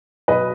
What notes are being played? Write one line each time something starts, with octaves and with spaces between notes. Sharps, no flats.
B2 F#3 B4 D#5